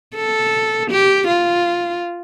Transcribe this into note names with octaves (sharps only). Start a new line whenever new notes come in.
A4
G4
F4